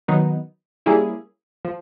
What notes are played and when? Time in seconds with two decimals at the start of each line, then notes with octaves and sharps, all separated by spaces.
0.08 D#3 F#3 B3 D#4
0.86 G3 A#3 C#4 E4 G#4
1.65 F3